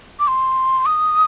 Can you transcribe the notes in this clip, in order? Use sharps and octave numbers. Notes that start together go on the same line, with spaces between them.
D6
C6
D#6